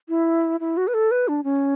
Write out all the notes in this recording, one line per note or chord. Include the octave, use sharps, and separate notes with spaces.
E4
E4
F#4
B4
A4
B4
D4
C#4